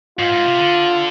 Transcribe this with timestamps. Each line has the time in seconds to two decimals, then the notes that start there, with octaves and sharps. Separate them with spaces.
0.19 G#2 F4
0.32 G#2
0.45 C3
0.58 D3